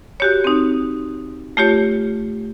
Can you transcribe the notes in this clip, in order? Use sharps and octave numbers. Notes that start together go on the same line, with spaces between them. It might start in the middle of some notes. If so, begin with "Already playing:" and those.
F#4 G4 C#5
C4 D#4
A3 F4 G4 C#5